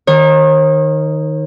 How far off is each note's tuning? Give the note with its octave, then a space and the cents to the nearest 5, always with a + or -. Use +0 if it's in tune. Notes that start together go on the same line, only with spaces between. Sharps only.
D#3 +0 C#5 -45